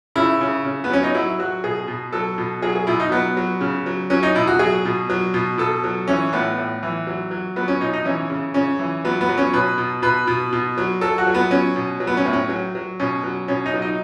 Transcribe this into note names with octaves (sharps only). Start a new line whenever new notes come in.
C#3 E4
C#3
C#3
B3
F#3 C#4
D#4
F#3 E4
F#3 F#4
B2 G#4
B2
F#3 A4
B2
F#3 G#4
G#4
B2 E4
D#4
F#3 B3
F#3
C#3
F#3
F#3 C#4
D#4
B2 E4
F#4
F#3 G#4
B2
F#3
B2
B2 A4
F#3
E3 C#4
A2 B3
A2
E3
F#3
F#3
F#3 B3
C#4
B2 D#4
D#4
E3 C#4
C#3
C#3 C#4
E3
F#3 B3
B3
F#3
C#4
B2 B4
B2
B2 B4
B2
B2
F#3
F#3 A4
F#4
F#3
B3
F#3 C#4
B2
F#3
B3
C#4
A2
C#4
F#3
F#3
B2 C#4
F#3
B2 C#4
D#4
F#3
D#4